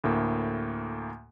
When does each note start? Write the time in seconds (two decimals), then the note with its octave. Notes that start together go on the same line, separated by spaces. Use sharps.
0.04 D2 A2 A#3